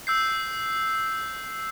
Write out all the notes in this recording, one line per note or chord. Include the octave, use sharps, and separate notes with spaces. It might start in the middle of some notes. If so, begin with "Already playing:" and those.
E6 G6 C7